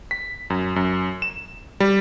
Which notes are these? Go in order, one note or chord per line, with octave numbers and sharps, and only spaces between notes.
B6
F#2
F#2
E7
G3